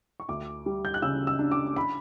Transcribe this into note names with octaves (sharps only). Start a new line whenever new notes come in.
C#6
D2 D6
G3
G6
F#6
C#3 E6
E6
D4
D6
B5